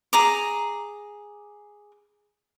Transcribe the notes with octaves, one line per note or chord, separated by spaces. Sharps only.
G#4 A#5 D6